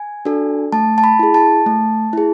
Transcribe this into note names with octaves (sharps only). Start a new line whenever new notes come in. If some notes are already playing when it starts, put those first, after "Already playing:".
Already playing: G#5
D4 F#4 A4
A3 A5
A5
B5
E4 G#4
A5
A3
E4 G#4